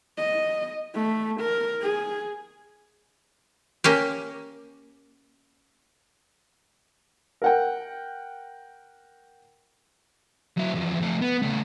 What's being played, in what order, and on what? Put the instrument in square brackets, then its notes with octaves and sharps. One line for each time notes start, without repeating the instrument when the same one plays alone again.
[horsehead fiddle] D#5
A3
A#4
G#4
[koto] A#3 C#4 G4
[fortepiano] A#4 F#5 G5
[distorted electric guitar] F#3 E4
E2 F3
F3 A3
B3
C#3 A3